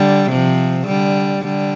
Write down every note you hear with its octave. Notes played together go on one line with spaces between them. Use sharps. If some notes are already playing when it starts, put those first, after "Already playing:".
Already playing: D3 G3
C3 F3
D3 G3
D3 G3